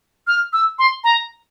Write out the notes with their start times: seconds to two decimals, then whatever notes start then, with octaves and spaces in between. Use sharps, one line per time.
0.27 F6
0.53 E6
0.79 C6
1.04 A#5